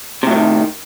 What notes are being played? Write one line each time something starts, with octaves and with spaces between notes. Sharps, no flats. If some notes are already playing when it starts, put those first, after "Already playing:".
A2 C3 D#3 F#3